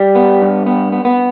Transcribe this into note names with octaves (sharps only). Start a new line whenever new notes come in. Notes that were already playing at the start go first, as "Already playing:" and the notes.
Already playing: G3
B3
G2
B3
B3
B3